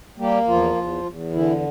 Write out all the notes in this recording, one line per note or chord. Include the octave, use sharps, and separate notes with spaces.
G3 A#3 G4
E2 F3 F4
E2
E2
D3 E3 E4